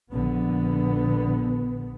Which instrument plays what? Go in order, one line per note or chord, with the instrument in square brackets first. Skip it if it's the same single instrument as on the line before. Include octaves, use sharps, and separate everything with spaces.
[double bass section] A#1 D3 B3